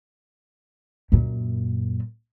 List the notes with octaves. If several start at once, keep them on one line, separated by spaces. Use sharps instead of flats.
F#2 A#2